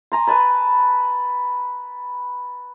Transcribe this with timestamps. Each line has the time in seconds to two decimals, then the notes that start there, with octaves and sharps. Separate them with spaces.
0.12 G#5 A#5 C6
0.27 B4 G#5 A5 B5